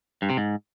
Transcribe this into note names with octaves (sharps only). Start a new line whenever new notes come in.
G2
C3
G#2